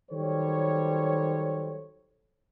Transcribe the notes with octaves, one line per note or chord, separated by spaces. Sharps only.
D#3 F#3 G3 A4 C5 C#5